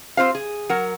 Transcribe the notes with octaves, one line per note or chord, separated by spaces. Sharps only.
C4 F4 C5 F5
G#4
F#3 A#4 F#5